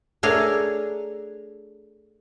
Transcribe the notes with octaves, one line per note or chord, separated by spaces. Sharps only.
A3 D4 G#4 A#4 C#5